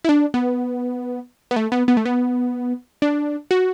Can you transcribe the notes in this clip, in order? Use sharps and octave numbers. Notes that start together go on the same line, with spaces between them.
E4
D4
B3
B3
A3
B3
B3
A3
B3
D4
F#4